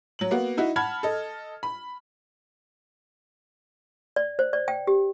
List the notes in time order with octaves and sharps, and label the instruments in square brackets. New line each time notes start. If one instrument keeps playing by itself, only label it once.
[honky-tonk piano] F#3 F#7
A#3 B3 F#4
D#4 E4 F#4
F#5 A5 B5 F6 G#6
A4 D#5
B5
[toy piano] D5
C5
D5
G5
G4